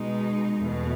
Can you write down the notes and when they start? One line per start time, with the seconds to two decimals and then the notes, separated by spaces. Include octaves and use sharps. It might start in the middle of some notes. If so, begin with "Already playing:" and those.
Already playing: B2 G#3 D#4
0.62 E2 B2 A3